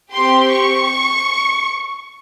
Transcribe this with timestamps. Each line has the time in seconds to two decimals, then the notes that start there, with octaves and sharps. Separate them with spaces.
0.13 C4 G4 C6
0.51 C#6